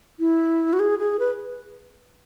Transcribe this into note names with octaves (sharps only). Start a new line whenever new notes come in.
E4
F#4
G#4
G#4
B4